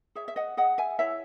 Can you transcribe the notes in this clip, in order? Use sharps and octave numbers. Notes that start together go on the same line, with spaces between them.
G#4 C#5 E5
E5
D#5 F#5
G#4 D#5 F#5
E5 G#5
E4 C#5 E5